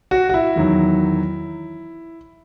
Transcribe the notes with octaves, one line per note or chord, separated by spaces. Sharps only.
F#4
F#4
E4
E2 D#3 F#3